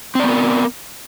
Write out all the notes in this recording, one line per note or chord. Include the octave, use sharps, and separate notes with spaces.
B3 C4 A#4 D5